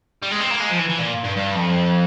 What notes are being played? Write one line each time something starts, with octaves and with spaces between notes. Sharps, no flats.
G3
G#3
C4
A#3
G#3
F3
E3
E3
A#2
G2
G2
F2